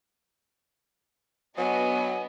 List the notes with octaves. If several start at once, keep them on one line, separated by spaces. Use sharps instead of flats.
F#3 B3 D4 F#4 D#5 G#5